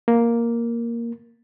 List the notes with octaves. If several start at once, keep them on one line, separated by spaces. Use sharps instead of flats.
A#3